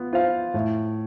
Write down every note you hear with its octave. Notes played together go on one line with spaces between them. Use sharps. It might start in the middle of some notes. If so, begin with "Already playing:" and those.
Already playing: B3 F4
F4 C5 F5
A2